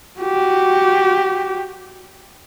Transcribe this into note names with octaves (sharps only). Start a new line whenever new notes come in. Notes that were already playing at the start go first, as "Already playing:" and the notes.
F#4 G4